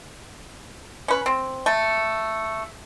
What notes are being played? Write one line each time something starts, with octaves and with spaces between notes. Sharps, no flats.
C#4 B4
C4
A3